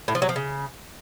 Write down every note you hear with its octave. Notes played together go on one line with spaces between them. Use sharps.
A2
F3
F#3
F3
C#3